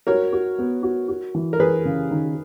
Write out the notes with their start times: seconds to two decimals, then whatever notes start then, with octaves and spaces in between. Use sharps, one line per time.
0.07 F#4 A#4 C#5
0.33 F#4
0.59 B3
0.83 F#4
1.08 F#4
1.35 E3
1.53 A#4
1.59 E3 G#4 B4
1.85 C#3
2.11 D#3